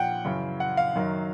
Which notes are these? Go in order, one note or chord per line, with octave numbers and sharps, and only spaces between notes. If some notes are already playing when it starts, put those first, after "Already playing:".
Already playing: A#2 F3 F#5 G5
F#2 C#3 E3
F#5
F5
F#2 D#3 F#3